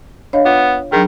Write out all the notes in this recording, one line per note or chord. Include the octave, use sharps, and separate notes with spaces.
D4 C#5 D#5 F5
B3 F4
D#3 F#3 D4 G#4